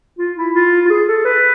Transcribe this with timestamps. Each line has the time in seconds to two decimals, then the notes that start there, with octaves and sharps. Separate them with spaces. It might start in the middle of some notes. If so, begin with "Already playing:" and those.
0.18 F4
0.37 E4
0.55 F4
0.86 F4
0.90 G#4
1.08 A4
1.25 B4